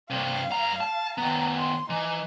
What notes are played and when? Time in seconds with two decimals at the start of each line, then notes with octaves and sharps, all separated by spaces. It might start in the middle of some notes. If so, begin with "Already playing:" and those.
0.10 G2 C3 F5
0.52 G2 A#5
0.81 A5
1.18 D#3 B3 A#5
1.56 C6
1.90 E3 D#4